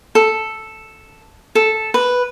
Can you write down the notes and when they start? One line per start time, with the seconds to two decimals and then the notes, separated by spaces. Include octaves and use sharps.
0.15 A4
1.55 A4
1.94 B4